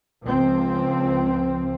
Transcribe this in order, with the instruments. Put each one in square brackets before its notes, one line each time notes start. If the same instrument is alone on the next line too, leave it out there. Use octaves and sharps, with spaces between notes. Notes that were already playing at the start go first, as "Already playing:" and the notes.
[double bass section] C#2 F3 C4